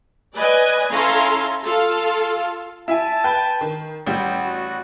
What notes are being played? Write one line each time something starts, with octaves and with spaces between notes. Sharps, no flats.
B4 D5 D#5 G#5
C#4 E4 A4 F5 A#5 C6
F4 A4 F5
E4 E5 G#5 A5
B4 G5
D#3
A1 G3 G5
F#4